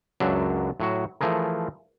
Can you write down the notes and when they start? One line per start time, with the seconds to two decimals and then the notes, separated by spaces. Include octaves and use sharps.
0.20 C#2 F#2 F#3 D4 E5
0.80 A2 F#3 F#4
1.21 E3 F3 A3 G#4 A#4